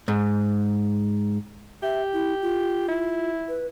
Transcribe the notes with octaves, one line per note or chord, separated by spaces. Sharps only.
G#2
G4 E5
E4
F4
E4
B4